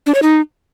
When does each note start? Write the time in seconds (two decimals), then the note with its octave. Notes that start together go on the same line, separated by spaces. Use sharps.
0.06 D4
0.15 C#5
0.23 D#4